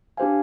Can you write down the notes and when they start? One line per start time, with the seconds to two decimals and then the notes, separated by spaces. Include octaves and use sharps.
0.17 D4 G4 C5 F5 G#5